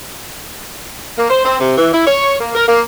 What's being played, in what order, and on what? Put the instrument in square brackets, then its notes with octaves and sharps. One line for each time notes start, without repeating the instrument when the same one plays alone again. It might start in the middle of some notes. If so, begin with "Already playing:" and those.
[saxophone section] A#3
C5
C4
C3
E3
E4
C#5
A#3
A#4
A#3